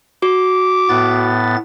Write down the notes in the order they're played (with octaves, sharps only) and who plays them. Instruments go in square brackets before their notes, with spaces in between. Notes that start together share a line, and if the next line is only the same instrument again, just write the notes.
[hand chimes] F#4 [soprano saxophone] D6
[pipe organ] A2 B3 A6